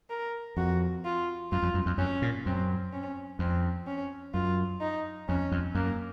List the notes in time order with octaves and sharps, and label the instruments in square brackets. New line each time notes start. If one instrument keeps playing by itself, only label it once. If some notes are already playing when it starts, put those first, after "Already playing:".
[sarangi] A#4
[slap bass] F2 [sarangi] F#4
[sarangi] F4
[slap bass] F#2 [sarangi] F4
[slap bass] F2
F#2
F2
[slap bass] F#2 [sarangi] C#4
[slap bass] A#2
[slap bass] F#2 [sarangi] C4
[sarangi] C#4
[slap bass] F2 [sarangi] C4
[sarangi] C#4
[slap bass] F#2 [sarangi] F4
[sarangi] D#4
[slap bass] F2 [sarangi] C#4
[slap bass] F2
[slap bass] F#2 [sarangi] A#3